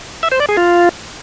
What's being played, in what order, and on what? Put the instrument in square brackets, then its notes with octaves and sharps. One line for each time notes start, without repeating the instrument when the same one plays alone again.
[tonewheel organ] E5
C5
D5
G#4
F4